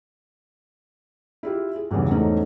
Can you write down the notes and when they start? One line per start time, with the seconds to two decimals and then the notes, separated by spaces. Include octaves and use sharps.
1.43 E4 F4 G4
1.76 G#4
1.91 B1 E2 G2 C#3
2.10 E2 G#2 A3 C#4 D#4